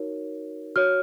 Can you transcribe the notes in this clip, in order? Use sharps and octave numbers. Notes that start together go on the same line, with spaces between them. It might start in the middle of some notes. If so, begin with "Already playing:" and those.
Already playing: D#4 F#4 A#4 C#5
F#4 C#5 F6